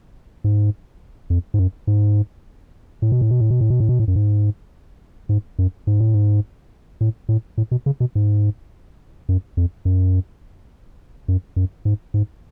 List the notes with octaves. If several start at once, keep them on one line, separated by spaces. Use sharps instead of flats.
G#2
F2
G#2
F#2
G#2
A2
B2
A2
B2
A2
B2
A2
B2
A2
B2
A2
F#2
G#2
G#2
F#2
G#2
A2
G#2
A2
A2
A2
B2
C#3
B2
G#2
F#2
F2
F#2
F#2
F#2
G#2
G#2